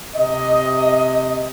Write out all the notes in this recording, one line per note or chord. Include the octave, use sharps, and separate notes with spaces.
C3 D#5